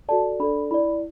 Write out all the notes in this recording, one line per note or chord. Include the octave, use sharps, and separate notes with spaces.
F#4 A4 D5 A5
D4 A4 D5 B5
E4 D5 B5